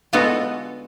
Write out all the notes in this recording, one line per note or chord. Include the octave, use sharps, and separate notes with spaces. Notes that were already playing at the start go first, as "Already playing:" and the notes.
D3 G#3 B3 F4 F#4 A4